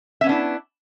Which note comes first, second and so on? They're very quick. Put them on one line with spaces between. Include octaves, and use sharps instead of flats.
E5 C#4 B3 D4 E4